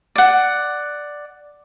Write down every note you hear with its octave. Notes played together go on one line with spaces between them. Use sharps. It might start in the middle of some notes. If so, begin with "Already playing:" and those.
D5 F#5